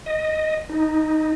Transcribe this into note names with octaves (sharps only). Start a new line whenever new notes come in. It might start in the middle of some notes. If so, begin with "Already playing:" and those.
D#5
D#4